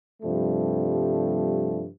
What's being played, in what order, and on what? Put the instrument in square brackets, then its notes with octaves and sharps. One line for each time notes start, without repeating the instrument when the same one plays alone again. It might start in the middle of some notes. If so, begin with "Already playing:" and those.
[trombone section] G2 C3 F3 G3 A3